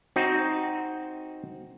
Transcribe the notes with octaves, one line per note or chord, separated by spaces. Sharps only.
C4 D#4 F#4